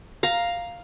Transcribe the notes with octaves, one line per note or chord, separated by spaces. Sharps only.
F5 A#5